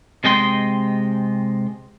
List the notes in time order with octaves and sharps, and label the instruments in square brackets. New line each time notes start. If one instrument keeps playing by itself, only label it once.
[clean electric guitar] C3 G#3 D#5 G5 C6